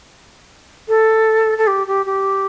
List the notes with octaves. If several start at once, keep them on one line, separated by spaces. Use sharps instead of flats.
A4
A4
G4
G4
G4